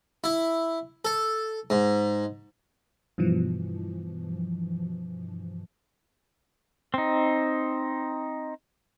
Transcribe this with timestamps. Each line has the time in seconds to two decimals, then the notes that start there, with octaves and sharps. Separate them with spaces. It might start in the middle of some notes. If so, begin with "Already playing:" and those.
0.24 E4
1.05 A4
1.70 G#2
3.18 G2 B2 E3 F3
6.94 C4 D#4